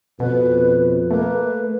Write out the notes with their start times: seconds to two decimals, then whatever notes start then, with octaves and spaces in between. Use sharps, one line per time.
0.20 F2 B2 B4
1.11 A3 A#3 B4